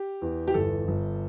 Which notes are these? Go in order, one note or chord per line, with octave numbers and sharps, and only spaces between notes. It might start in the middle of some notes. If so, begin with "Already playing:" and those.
Already playing: G4
E2
G4
G1 A4
G1